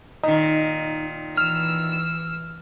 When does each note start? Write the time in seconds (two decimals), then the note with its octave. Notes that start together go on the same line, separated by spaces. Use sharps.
0.23 A#2 D#3 D#4
1.37 E3 E6 F6